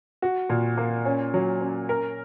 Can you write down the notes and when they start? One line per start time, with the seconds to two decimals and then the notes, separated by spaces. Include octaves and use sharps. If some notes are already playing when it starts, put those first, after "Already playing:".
0.22 F#4
0.50 A#2
0.77 A#3
1.05 C#4
1.34 F#3
1.61 C#4
1.89 A#4